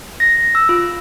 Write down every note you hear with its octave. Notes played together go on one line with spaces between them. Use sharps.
A#6
E6
F4